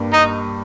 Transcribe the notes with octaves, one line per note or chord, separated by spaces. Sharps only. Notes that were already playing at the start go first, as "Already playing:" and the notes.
Already playing: G2 G3 A#3
D#4